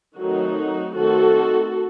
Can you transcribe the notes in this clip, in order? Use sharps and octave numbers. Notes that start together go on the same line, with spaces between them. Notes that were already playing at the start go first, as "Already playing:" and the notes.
D#3 F#3 A3 C4 D#4 F#4
D#3 A3 C4 F#4 A4